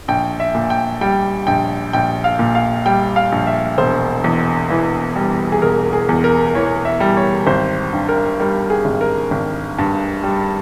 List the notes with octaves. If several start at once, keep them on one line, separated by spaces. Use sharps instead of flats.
A#1 G5
E5
A#2
G5
G3 G5
A#1 G5
A#1 G5
F5
A#2
F5
G3 G5
F5
A#1
E5
E1 C5
E2
E3
G3
G#4
E1 A#4
G#4
E2
A#4
E3 C#5
E5
G3
C#5
G#1 C5
G2
A#4
G3 A#4
G#4
G#1
A#4
G#1
G2
G3